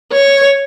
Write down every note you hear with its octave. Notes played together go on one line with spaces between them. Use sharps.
C#5